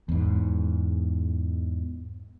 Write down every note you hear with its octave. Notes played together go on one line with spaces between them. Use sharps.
E2 G#2